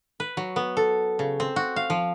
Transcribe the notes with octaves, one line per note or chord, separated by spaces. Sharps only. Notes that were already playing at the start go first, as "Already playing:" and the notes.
B4
F#3
B3
A4
C#3
C4
F#4
F5
F3